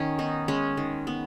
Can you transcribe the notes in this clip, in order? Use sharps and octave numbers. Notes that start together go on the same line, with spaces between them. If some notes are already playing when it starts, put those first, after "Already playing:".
Already playing: D#3 C#4
B3 D#4
G#3 C#4
D#3
B3